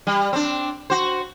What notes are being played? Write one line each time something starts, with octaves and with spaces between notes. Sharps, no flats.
G3
C4 D4
F#4 C5